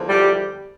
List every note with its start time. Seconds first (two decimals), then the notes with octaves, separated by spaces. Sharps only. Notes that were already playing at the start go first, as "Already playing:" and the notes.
Already playing: E2 D3 F3
0.09 G3 G4